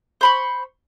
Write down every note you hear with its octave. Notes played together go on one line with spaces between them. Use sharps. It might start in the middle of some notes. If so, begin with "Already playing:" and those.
C5 B5 C#6